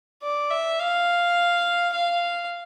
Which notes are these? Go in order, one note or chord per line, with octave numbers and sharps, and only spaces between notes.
D5
E5
F5
F5